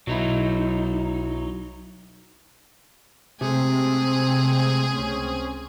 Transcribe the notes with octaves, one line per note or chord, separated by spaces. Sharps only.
B1 F#3 D#4 E4
C3 G#3 A3 C4 G#4
C#2 C4 C#4